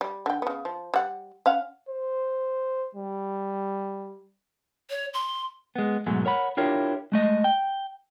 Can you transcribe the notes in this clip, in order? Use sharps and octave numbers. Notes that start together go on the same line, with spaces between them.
G3
D3 G5
C#3 B3
F3
G3 F#5
C#4 F5 F#5
C5
G3
C#5
C6
G#3 B3
G#2 B2 F#3 G#3 A3
A#4 C#5 F#5 B5
D4 E4 F4 G4 A#4 C#5
G#3 A3 D#5
G5